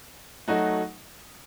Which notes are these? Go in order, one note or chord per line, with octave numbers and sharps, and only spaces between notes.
F#3 A3 D#4 F#4